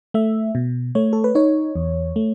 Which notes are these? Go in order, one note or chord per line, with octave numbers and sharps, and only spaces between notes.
A3 E5
B2
A3 C#5
A4
B4
D#4 C#5
E2
A3